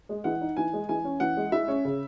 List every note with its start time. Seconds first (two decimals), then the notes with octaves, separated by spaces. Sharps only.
0.09 G#3
0.24 E3 F#5
0.41 D#4
0.57 E3 G#5
0.73 G#3
0.89 E3 G#5
1.05 C#4
1.20 E3 F#5
1.37 G#3
1.52 E4 E5
1.68 C#4
1.85 C#3